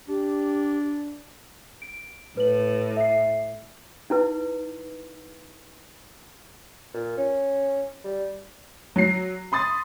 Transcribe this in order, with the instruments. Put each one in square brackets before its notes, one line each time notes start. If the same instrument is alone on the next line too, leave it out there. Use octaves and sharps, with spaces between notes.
[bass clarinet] D4 [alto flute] G4
[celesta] D7
[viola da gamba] A2 [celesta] B4 F#7
[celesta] E5 C7
[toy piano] D#4 E4 B4
[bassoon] A#2
C#4
G3
[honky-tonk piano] F#3 C7
B5 C6 D#6 A6